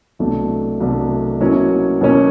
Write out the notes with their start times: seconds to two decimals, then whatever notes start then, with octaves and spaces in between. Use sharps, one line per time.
0.19 C2 B2 F#3 A3 D4
0.80 C2 B2 F#3 A3 D4
1.40 B2 F#3 A#3 C#4 E4
2.01 B2 F#3 A#3 C#4 E4